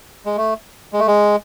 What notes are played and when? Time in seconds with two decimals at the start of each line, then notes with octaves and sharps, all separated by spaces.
0.26 G#3
0.37 A3
0.93 G#3
1.00 A3
1.07 G#3